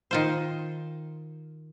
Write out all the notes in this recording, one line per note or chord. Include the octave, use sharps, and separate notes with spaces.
D#3 F4 C5